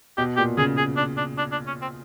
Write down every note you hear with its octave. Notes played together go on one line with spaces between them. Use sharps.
B2 G4
A#2 G4
C#3 G#4
G#4
D4
D4
D4
D4
C#4
C4